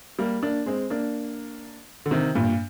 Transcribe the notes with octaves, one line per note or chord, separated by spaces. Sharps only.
G3 A#3
A#3 D4
G#3 C4
A#3 D4
D3
C3 D#3
G2 A#2